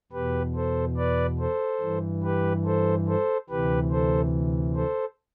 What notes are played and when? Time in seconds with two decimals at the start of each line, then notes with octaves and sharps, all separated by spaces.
0.12 E2 B2 G4 B4
0.55 A4 C5
0.97 B4 D5
1.38 A4 C5
1.81 G2 E3
2.23 G4 B4
2.65 A4 C5
3.08 A4 C5
3.50 D2 C3 E3 G4 B4
3.91 A4 C5
4.75 A4 C5